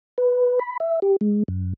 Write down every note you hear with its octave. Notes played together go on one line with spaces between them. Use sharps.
B4
B5
E5
G4
G#3
F#2